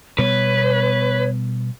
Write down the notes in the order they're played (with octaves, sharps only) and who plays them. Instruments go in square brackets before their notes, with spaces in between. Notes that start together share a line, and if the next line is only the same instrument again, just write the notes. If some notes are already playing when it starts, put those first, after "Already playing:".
[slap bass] B2 G3 B3 [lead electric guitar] B4 [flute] C#5